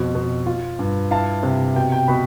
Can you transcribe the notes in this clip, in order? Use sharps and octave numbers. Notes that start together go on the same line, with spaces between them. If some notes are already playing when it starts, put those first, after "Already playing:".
Already playing: F2 B2
B2
F4
G2
E4 F5 A5
C3
B2 G5
G5
B2 G5 B5